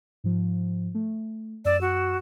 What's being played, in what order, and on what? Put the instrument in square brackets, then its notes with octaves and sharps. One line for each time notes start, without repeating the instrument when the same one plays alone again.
[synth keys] G#2 F3
A3
[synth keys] F#2 E6 E7 [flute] D5
[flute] F#4